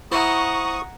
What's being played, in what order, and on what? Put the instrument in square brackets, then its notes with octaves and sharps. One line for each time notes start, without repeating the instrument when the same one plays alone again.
[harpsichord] E4 C5 [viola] F#5 A#5 [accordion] C#6 D#6